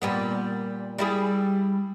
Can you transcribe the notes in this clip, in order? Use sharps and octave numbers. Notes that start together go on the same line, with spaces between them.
A#2 G3 B3
G3 E4 G#4